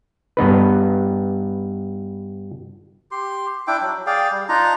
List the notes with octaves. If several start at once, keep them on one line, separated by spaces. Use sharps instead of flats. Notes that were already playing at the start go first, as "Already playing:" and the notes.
G2 B3 D#4 B4
G4 C6
D4 E4 G5 D6
F#3
G#4 D5 F5 G5
G3
D4 D#4 F4 A#5